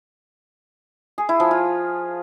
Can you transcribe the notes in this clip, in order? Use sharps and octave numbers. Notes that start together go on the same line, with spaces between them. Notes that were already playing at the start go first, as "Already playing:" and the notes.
G#4
E4
F3
F4